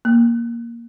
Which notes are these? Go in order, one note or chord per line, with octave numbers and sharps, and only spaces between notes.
A#3